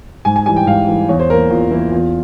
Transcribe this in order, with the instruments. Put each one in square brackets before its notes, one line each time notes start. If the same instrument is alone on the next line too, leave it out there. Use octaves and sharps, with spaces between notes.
[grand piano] G#2 G#5
G#5
E3 G3 G#5
G5
G#2 F5
E3 G3
E2 C#5
C5
E3 A#3 A#4
E2 F4
E3 A#3 E4
E2 F4